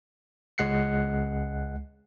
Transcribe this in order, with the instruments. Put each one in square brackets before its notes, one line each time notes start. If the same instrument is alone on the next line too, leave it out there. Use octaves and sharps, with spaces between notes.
[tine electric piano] C#2 G#3 F#5 F#6 C7 C#7